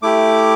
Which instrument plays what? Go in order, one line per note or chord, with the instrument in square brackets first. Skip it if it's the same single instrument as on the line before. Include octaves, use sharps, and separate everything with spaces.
[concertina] A3 E4 G4 D6